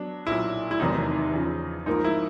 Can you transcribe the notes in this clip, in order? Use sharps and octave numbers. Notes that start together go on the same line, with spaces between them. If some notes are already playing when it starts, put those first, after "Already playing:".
Already playing: F#3 B3 D4
B1 A#2 F#3 E4
E4
F1 E2 C3 D#3 F#3 D#4
E2 C#3 F3
G#2 F3 A#3 D#4
E4